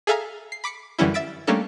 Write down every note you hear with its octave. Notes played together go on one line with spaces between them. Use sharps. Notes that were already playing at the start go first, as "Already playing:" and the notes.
G#4 A4 E5 F5 G#5 A#5
C7
B5 D6 B6 C#7
F#2 D3 E3 G3 C#4 E4
E5 E6 A6 B6 D7
G3 A3 A#3 C#4 D4 A4